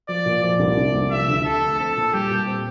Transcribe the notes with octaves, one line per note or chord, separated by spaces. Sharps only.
F3 D5
A#2
F3 D5
C2
C3
C2
F3 E5
D2
D3 A4
A3
C4 A4
A#2
G3 G4
A#2
C4